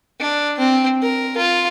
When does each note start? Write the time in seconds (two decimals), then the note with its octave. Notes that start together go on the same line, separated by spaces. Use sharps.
0.19 D4
0.59 C4
1.02 A#4
1.37 F4